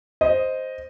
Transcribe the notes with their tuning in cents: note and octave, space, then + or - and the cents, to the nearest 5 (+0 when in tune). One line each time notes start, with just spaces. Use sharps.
C5 +0 D#5 +0